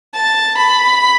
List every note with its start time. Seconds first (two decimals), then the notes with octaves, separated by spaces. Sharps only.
0.13 A5
0.57 B5